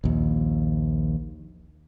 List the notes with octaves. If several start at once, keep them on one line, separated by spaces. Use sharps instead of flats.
A#1 D#2